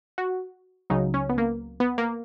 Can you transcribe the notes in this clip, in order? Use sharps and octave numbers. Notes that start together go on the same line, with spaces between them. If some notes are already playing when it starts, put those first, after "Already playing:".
F#4
C#2 C#3 F#3 D#4
C#4
B3
A#3
B3
A#3